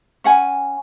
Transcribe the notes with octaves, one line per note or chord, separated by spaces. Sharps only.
C#4 F#5 G#5